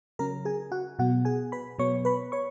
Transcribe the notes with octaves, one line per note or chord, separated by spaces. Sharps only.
C#3 F#3 C#4 A#4 A#5
G#4 G#5
F#4 F#5
B2 F#3 B3 F#4 F#5
G#4 G#5
B4 B5
B2 F#3 B3 C#5 C#6
B4 B5
C#5 C#6